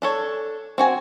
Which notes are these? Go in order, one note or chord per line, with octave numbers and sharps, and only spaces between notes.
D4 A4 C#5
C4 F#4 G#5